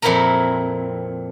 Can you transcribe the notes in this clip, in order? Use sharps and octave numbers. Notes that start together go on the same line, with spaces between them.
F2 A#2 C4 E4 A#4 A#5